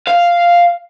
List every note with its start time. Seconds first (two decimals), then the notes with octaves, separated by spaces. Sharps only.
0.08 F5